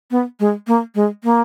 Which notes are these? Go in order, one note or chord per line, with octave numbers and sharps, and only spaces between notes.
B3
G#3
A#3
G#3
A#3